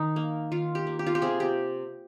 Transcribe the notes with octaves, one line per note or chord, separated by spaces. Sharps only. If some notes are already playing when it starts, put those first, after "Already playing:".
Already playing: D#3 D#4
A#3
D#3 F4
G4
A#3
G4
F4
G4
C3 G#4
G4